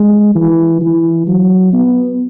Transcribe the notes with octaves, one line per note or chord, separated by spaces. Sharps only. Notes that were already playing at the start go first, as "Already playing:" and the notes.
Already playing: G#3
E3
E3
F#3
B3